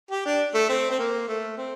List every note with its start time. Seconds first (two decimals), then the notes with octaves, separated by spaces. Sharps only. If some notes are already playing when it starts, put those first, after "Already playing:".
0.11 G4
0.26 D4
0.55 A3
0.70 C4
0.91 C4
0.99 A#3
1.28 A3
1.58 C4